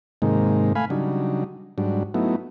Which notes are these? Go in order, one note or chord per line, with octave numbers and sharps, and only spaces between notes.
G#2 C3 D#3 G#3 A#3 D#4
A3 F5 G#5 B5
C#3 F#3 G3 D4 D#4
G#2 F#3 G3 D4
F#3 A3 B3 D#4 E4